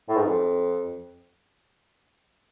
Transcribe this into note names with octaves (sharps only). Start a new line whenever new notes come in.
A2
G#2
F2